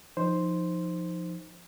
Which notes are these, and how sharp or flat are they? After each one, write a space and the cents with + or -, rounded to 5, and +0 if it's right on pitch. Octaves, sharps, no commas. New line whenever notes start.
F3 +0 D#4 +0 C5 +0